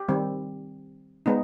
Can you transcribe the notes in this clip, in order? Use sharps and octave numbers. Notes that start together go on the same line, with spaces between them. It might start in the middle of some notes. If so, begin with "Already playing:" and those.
Already playing: G4
D#3 G3 C4
G#3 B3 D#4